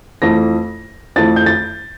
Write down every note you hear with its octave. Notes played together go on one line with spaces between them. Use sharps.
F2 E3 A3 A#6
F2 E3 A3 A6
G6
A6